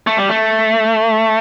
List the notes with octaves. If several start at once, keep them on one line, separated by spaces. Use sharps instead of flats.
A3
G3
A3